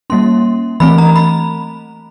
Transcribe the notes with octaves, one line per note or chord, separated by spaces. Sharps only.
G3 A#3 C#4 C6
E3 A3 C4 B5
A#5
B5